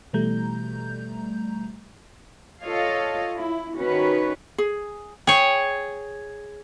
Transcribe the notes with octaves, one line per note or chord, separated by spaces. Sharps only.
B2 E3 G3 A3 A#5 G6
F4 A4 C#5 D#5 F5
E4
D#3 C#4 F#4 B4
G#4
G#4 C#5 G5